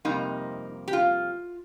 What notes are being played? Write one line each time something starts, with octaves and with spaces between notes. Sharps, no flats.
F2 C3 G3 A#3 D#4
G4
F4